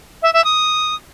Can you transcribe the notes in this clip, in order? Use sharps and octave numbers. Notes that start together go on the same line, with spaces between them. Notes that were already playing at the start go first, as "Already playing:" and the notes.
E5
E5
D#6